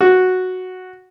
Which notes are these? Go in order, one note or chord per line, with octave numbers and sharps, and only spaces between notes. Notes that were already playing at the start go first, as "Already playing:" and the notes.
F#4